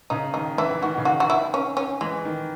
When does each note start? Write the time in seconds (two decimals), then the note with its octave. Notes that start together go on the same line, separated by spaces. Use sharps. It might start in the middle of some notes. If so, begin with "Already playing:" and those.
0.10 C#3 D#4
0.34 D#3 D#4
0.58 E3 E4
0.82 D#3 F#4
0.98 C#3
1.05 D#3 F#4
1.20 F#4
1.30 E4
1.54 C#4
1.77 C#4
2.01 E3 G#3
2.25 D#3